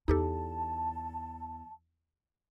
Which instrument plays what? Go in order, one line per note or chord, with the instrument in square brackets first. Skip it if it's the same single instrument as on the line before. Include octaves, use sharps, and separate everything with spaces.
[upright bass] E2 [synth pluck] D#4 G4 A4 [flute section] A5